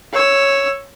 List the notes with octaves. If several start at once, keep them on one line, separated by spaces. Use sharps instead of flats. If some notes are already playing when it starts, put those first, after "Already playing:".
C#5 E6